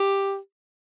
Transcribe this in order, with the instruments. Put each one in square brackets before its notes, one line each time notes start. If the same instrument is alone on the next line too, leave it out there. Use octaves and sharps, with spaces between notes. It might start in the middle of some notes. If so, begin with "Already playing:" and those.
Already playing: [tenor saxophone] G4